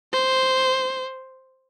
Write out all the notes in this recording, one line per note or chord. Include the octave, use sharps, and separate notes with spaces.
C5